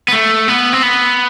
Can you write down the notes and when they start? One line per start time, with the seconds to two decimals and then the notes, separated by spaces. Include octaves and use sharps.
0.08 B3
0.13 A3
0.48 B3
0.73 C4
0.83 B3